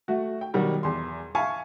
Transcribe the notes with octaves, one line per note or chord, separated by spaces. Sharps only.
A3 F#4
G5
B2 D#3 F#3 G3 F#4
E2 C6
E5 F5 G#5 A5 B5 C#6